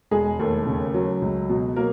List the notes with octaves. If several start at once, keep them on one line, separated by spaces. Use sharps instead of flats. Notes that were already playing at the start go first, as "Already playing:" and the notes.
E1 G#3 G#4
D#2 A3 A4
C#3
F#3
C#2
B2
F#3 A#3 A#4